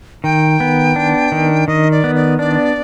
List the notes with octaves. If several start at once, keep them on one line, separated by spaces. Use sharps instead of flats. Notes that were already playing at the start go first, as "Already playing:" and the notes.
D#3 G5
B3
D4
D#3
D#3 D#5
D5
B3
D5
D4 D5